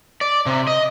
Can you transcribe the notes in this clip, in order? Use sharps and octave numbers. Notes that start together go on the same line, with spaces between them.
D5
C3
D#5